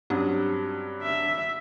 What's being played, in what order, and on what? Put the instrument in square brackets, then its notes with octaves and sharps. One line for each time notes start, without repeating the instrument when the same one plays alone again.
[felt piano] G2 F#3 C4 [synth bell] C#4 G4
[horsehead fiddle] E5